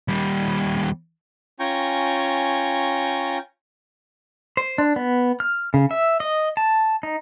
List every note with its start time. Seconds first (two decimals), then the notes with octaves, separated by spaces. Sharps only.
0.08 D#2 G3
1.60 C#4 F4 G5 G#5 A#5 C#6
4.57 C5
4.78 D4
4.96 B3
5.40 F6
5.74 C#3
5.91 E5
6.20 D#5
6.57 A5
7.03 D#4